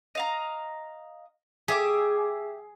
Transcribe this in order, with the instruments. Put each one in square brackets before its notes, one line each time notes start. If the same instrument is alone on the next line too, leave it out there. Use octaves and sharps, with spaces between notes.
[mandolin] D#5 F5 A#5
[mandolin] G4 E5 D6 [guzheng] G#4